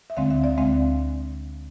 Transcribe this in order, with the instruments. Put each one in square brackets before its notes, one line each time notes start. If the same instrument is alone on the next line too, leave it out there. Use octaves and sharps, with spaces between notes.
[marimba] E5
D2 D3 G#3 C4 F5
E5
D5
D2 D3 G#3 C4 F5